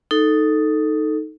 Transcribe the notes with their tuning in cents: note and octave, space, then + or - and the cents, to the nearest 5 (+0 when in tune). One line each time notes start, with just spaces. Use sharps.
D#4 +0 A4 +0